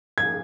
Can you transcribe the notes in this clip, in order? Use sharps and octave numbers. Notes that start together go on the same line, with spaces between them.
G#6